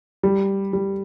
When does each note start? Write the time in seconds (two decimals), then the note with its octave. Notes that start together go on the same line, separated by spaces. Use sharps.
0.23 G3
0.73 G3